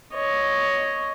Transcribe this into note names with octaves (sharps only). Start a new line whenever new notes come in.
C#5 D#5